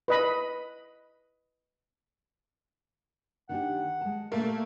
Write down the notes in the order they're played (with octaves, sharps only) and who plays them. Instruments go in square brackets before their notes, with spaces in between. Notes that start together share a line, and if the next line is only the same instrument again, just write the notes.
[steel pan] B4 D#5 B5
[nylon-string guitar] D#3 D4 G4 [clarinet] F#5
[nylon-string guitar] G#3 A5
[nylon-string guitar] A#2 [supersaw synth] A3 [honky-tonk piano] A#3